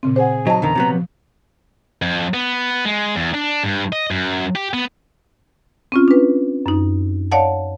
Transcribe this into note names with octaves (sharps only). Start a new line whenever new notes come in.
A#2 C#3 C4
G#4 C5 F#5
F#3 D#4 C5 D#5 A5
E2 D3 D#3 A#5
C3 F#3 B3
F3
F2
B3
G#3
E2
D4
G2
D#5
F#2
G4
B3
C4 C#4 F4
D4 B4
F#2 D#4
C#5 D5 F5 F#5 A5